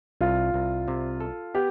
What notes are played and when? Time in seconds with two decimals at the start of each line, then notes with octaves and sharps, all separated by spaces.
0.21 C2 F4
0.54 C2
0.88 C3
1.20 A4
1.54 B3 G4